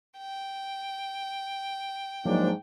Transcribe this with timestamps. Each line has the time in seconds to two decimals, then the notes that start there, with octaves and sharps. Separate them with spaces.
0.19 G5
2.26 G#2 F3 F#3 A#3 D4